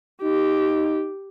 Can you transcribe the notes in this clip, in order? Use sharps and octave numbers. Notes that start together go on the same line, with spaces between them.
D#4 G4